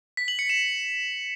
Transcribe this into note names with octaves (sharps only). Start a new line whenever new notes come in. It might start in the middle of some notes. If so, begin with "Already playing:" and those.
B6
F#7
C#7
E7